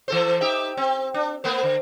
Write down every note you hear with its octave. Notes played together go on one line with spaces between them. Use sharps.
E3 A4 C5
D#4 G4 E5
C4
D4
A3 B3 C5
D3